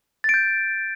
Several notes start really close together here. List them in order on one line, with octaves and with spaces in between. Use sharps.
A6 D7 G6